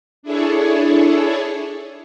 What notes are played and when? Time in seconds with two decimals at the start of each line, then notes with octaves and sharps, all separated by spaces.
0.23 D4 E4 G#4 A4 C#5